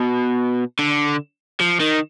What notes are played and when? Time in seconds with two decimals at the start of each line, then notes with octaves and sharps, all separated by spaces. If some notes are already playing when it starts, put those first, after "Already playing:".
Already playing: B2
0.79 D3
1.60 F3
1.80 D#3